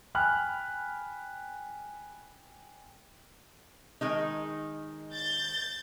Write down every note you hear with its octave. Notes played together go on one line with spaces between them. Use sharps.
G5 G#5 B5 F6 F#6
D#3 G#3 D#4
G6 A6